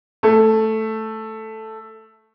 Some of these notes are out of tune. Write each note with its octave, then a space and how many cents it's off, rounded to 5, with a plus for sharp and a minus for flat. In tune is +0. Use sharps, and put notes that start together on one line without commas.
A3 +0